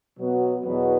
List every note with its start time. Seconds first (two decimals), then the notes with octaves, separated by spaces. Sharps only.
0.17 B2 F#3 B3 F#4
0.65 E2 B2 F#3 B3